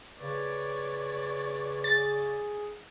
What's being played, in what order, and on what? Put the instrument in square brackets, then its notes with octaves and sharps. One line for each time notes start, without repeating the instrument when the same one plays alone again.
[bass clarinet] C#3 [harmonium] B4 [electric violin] C#5 D5
[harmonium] G#4 [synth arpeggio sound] A6